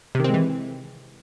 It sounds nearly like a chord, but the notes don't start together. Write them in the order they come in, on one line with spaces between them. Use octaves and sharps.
C3 D#3 C4 G#3 E3